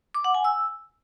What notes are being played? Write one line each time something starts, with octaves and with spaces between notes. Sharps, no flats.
D6
F#5
G#5
E6